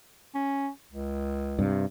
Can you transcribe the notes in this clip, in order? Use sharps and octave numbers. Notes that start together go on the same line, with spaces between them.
C#4
C#2
G2 C3